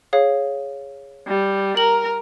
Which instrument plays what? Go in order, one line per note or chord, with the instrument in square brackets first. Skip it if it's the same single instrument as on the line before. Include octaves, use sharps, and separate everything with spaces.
[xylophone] G#4 C#5 F5
[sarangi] G3
[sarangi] A#4 [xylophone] F#7